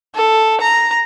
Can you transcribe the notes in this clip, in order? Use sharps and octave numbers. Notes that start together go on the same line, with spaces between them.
A4
A#5